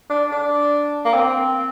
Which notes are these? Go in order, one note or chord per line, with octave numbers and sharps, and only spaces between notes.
D4
D4
A#3
C4